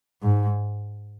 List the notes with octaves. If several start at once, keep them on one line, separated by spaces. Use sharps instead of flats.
G#2